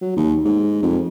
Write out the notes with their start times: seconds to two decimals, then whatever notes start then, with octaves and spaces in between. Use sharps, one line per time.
0.02 F#3
0.16 D#2
0.45 G#2
0.83 F2